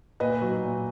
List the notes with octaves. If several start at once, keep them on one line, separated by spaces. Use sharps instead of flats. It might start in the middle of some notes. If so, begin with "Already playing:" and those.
A#2 B4 D#5
F#3
A#2